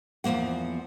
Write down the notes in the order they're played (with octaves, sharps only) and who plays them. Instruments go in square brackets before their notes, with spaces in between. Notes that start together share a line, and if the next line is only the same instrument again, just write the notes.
[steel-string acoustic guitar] E2 F3 F#3 A#3 F#5